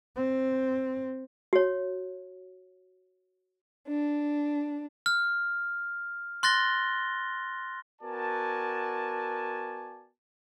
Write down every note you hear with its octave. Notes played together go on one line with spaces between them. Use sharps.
C4
F#4 C#5
D4
F6
C6 F#6 A6 A#6 G7
B3 F#4 A#4 D5 G#5 A5